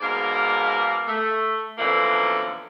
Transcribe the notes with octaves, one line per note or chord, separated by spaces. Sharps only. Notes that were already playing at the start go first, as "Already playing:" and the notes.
G#2 B2 A#3 A#4 D5 F5
A3
F#2 B2 D3 E3 F3 A#3